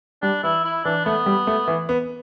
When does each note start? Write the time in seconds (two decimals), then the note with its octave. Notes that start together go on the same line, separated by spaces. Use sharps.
0.22 G3 D4
0.44 E3 E4
0.64 E4
0.84 E3 D4
1.05 A3 B3
1.26 G3
1.47 A3
1.68 E3
1.89 B3